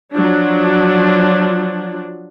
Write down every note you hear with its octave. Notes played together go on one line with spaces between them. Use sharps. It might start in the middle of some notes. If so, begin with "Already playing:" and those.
F3 F#3 D4